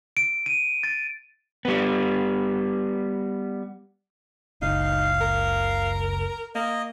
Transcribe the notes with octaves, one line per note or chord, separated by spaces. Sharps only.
D7
D#7
A6
G3 B3
F#1 C#2 D#4 F5
A#4
A#3 D#5